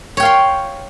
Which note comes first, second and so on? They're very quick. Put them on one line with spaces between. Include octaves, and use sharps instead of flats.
C#5 G5 F5 C6